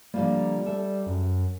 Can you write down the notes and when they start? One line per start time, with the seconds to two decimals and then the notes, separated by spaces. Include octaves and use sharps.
0.14 D3 F3 G3 A#3
0.66 A4 E5
1.07 F#2